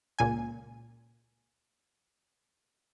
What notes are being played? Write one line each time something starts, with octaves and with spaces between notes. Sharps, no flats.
C#2 A#2 G#5